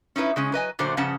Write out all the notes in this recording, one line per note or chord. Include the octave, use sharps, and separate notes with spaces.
C#4 D#4 E4 B4
C#3 G#3 C#4
F#3 B4 D#5 G#5
A#2 D3 F#3 A3 C5
G2 C#3 F3 C#4 F#5 A5